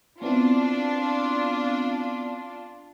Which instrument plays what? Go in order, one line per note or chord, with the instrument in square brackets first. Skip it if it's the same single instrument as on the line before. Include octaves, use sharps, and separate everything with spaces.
[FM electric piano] B3 C4 E4 [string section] D4 F4